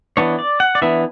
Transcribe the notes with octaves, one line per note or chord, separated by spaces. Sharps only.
E3 B3 D4 C#5
D5
F#5
D5
E3 B3 D4 E5